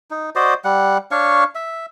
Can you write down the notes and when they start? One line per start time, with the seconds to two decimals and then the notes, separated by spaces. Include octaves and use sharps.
0.11 D#4
0.36 F#4 C5 D5 D#5
0.65 G3 F#5
1.11 D4 C#5 F5 C#6
1.55 E5